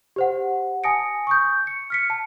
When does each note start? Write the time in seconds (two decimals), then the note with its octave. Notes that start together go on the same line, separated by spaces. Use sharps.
0.16 G4 C5 F#5
0.84 G#5 A5 D#6 A#6 C#7 D7
1.27 C#6 D#6 G6
1.67 C#7
1.90 F6 B6 C#7
2.10 A5